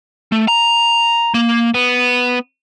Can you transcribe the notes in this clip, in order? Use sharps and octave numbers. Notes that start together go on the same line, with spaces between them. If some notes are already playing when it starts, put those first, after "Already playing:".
A3
A#5
A#3
B3